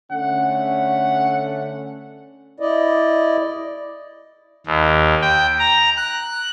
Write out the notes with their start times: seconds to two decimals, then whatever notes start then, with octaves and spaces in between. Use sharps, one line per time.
0.11 D3 A3 C#4 F#5
2.60 E4 D5 D#5
4.66 D#2
5.22 G5
5.59 A#5
5.97 F#6